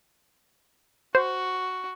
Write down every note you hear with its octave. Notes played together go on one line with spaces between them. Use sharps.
F#4 C5